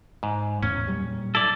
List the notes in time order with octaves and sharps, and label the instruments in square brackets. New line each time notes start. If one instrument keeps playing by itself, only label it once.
[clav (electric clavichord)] G#2
[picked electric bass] E2 A2 [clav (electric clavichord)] C#4
[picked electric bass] A#2 F#3 G3
[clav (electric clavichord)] E4 [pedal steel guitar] A4 D5